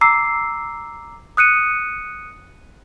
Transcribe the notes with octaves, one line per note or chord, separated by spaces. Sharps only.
A#5 D6 E6 C7
D#6 F#6 C#7 D#7